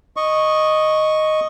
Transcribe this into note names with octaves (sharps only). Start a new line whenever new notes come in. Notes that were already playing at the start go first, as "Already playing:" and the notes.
D#5 C#6